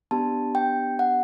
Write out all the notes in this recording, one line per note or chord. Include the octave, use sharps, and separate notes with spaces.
B3 D4 G4 A5
G5
F#5